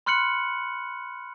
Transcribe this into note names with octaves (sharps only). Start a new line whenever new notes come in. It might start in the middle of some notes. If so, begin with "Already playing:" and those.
B5 C6 F6 F#6 C#7 F#7